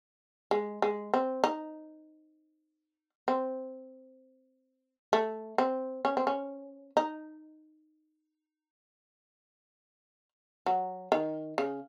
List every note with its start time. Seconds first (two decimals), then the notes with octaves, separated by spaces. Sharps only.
0.51 G#3
0.82 G#3
1.14 C4
1.44 D#4
3.28 C4
5.13 A3
5.58 C4
6.05 C#4
6.17 C4
6.27 C#4
6.97 D#4
10.66 F#3
11.12 D#3
11.58 C#3